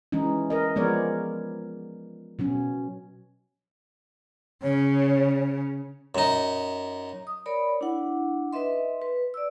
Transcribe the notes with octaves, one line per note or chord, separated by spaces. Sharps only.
E3 G#3 C#4 D#4
A#4 D#5
F3 G#3 B3 A#4 C#5 D5
B2 F#3 C#4
C#3 C#5
F#2 D#4
D#6
A#4 C#5 D5 B5
D4 E4 F#5
D#4 B4 D#5 E5 C6
B4
D5 E6